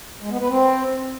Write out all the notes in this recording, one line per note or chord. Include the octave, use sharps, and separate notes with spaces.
G#3
B3
B4
C4